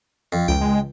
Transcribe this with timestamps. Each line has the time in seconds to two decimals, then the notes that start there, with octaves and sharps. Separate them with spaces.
0.33 F2
0.48 C#2 G5
0.61 G#3